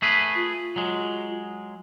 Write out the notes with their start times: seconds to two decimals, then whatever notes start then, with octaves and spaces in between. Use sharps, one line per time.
0.02 A3 G#4 B4
0.35 F4
0.76 F#3 G#3